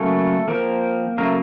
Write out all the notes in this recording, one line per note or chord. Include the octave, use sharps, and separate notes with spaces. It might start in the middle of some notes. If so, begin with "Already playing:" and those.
Already playing: C#3 F#3 A3 A#3 C#4 A4
F3 A#3 C4 A#4
C#3 F#3 A3 A#3 A#4